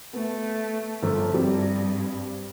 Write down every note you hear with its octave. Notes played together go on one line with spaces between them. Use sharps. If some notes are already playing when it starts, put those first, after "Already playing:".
A3 B3
G1 F3 A4
G2 G3 C4